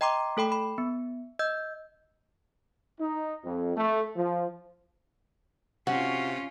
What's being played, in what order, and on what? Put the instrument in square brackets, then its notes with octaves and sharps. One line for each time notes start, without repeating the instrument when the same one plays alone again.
[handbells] D#5 G5 A#5 C6 D6
A3 A4 G5 B5
B5
B3
D#5 E6 G6
[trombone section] D#4
F2
A3
F3
[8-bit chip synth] C3 [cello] C#4 F4 [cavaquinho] F#4